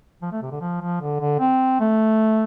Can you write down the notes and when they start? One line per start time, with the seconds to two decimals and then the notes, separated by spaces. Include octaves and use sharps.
0.22 F3
0.32 A3
0.42 C3
0.51 D3
0.61 F3
0.82 F3
1.01 D3
1.20 D3
1.40 C4
1.80 A3